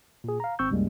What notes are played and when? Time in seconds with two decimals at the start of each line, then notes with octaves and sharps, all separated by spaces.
0.24 A#2 G#4
0.40 F5 A#5
0.59 G#1 C4 C#6 E6 G6
0.71 C2 F#2 G3 G#3 A#3